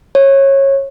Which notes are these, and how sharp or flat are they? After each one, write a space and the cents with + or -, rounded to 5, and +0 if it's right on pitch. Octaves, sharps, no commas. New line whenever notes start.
C#5 -20